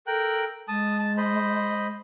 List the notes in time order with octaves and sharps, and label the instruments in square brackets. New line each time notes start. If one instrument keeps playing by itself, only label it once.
[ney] A4 [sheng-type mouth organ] A#4 G5 F#6
[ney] G#3 [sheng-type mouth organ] A5 D#6
[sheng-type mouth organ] A5
C5 D#5 B5